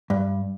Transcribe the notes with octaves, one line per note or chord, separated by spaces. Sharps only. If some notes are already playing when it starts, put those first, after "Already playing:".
G2